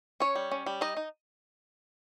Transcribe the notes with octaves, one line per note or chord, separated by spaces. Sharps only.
C#4 C#5
G3
C#4
G3
D#4 D#5
D#4